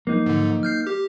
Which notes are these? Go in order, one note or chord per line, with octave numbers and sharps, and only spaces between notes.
F3 F#3 A#3 D#4
G#2 D3
F6 G6 C7
G4